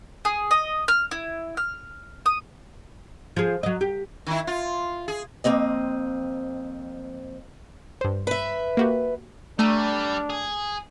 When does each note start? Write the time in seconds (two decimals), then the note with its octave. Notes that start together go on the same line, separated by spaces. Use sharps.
0.25 G#4
0.51 D#5
0.88 F6
1.11 E4
1.57 F6
2.26 D#6
3.36 F3 G#4
3.63 F#3 D#5
3.81 G4
4.27 D#3 E4
4.47 F4
5.08 G#4
5.44 F2 A#3 C4 D#5
8.01 G2 C5
8.27 B4 E5
8.77 A#3 F#4 G4
9.59 G3 A3 D4 A#5 D#7
10.30 G#4